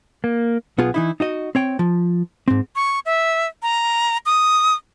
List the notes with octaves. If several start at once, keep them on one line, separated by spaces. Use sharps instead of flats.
A#3
B1 B3 F4 G#4
E3 D#4 E4
D#4 F#4 D#5
C4 C#5 G5
F3
G#2 C4
C#6
E5
A#5
D#6